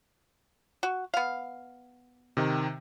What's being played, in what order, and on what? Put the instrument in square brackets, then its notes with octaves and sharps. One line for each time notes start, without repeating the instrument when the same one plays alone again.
[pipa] F#4
B3 F5
[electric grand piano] C3 D#3